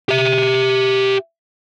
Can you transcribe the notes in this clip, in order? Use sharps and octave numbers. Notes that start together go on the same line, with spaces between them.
G4 E5